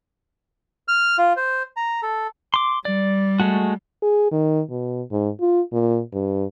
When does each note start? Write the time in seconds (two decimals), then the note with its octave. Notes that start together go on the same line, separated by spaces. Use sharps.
0.88 F6
1.18 F4
1.36 C5
1.77 A#5
2.02 A4
2.54 C6 D6
2.85 G3 D5
3.40 G#3 A3 F#4
4.03 G#4
4.31 D#3
4.70 B2
5.12 G#2
5.40 F4
5.73 A#2
6.13 G2